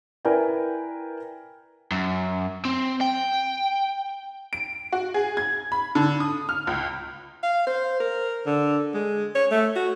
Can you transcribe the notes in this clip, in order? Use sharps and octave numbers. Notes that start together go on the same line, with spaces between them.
E4 A#4 B4 D5 G5 G#5
F#2
C4
G5
D7
F#4
G#4
G#6
B5
D3
D#6
F6
C#2
F5
C5
A#4
D3
G#3
C#5
A3
F#4